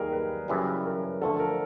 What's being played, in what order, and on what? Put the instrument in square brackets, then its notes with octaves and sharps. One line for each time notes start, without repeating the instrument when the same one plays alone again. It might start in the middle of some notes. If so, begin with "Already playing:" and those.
Already playing: [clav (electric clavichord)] D#2 D#3 G3 A#3 [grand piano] G#4 A#4
[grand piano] B4
[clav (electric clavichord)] F#2 C#3 E3 G3
[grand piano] A#4
[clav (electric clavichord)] D3 F3 A3 [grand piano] A4
[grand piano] A#4